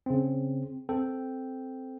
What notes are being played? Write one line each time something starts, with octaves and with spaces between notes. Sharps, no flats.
C#3 C4
C4 A4 G5